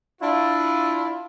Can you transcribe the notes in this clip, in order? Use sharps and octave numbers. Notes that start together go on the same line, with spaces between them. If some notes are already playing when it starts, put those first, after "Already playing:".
D4 E4 F4